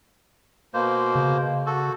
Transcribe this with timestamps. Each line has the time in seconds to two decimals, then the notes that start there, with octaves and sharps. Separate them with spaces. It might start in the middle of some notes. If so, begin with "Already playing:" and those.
0.74 B2 A#3 C5
1.15 C#3
1.66 F#4 A4